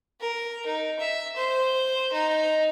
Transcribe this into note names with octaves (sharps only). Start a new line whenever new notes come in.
A#4
D#4
E5
C5
D#4